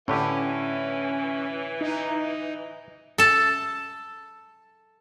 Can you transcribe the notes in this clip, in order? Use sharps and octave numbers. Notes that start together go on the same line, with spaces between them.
A2 D3 E3 C#4 G4
D#4
A4 A5